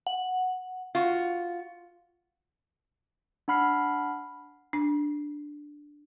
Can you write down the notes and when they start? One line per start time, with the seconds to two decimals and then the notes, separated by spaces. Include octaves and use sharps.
0.07 F#5
0.95 F4 F#4
3.48 D4 F#5 B5 F6 C7
4.73 D4